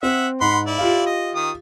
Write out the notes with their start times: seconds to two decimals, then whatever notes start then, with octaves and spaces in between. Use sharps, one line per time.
0.03 C4 E5 F#5
0.41 G#2 F#5 B5 C6
0.66 E4 D5
0.78 F4 G4 F5
1.06 D#5
1.35 D#3 D#6